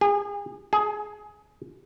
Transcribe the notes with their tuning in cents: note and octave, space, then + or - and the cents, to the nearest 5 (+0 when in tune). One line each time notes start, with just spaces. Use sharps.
G#4 -35
G#4 +15